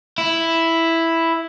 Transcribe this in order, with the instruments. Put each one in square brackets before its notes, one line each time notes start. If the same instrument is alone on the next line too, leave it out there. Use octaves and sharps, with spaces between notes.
[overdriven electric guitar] E4